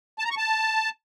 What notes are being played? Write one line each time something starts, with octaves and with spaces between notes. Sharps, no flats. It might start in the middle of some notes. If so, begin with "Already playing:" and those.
A5
A#5
C#6
A5